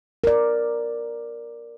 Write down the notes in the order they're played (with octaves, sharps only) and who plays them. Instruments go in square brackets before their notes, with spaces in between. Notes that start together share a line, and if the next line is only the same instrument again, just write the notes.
[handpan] A#4 D5